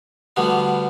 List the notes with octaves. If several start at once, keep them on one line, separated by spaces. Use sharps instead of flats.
D2 D3 G3 B3